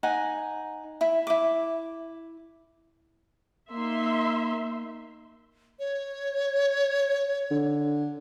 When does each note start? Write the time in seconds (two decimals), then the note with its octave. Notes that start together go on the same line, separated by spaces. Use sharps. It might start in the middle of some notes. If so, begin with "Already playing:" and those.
0.03 D#4 F#5 G#5
1.01 E4
1.27 E4 D6
3.72 A#3 D#4 E5 C6
5.79 C#5
7.51 D3